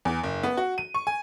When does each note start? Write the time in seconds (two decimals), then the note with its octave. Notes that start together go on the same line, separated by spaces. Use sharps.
0.05 E2
0.24 F#1
0.43 B3
0.57 F#4
0.78 D#7
0.94 C#6
1.07 G#5